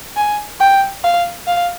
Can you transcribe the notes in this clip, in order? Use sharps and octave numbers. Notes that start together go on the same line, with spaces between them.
G#5
G5
F5
F5